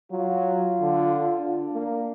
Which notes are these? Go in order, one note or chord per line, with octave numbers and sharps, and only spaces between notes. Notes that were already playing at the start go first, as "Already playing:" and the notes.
F#3 F4
D3
D4
A#3